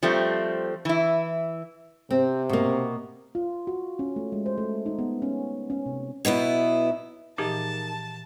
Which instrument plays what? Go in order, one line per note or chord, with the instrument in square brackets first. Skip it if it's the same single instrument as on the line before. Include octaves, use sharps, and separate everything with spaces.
[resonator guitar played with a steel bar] F3 G3 A3 C4
E3 E4
[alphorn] C3 [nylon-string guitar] C4
[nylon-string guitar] B2 A#3
[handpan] F4
F#4
C#4
A3
G#3
C5
A3
D#4
B3
C#4
C#4
C3
[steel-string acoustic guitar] B2 F#3 B3 E4
[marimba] A#2 E3 F3 [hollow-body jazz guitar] D#4 G#4 A#4 [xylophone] G4 [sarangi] A5